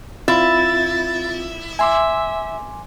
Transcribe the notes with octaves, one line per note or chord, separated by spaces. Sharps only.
C4 E4 F4 A6
E5 G#5 C6 D6